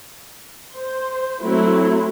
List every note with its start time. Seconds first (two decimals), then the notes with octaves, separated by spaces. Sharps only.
0.74 C5
1.42 F#3 A3 C4 E4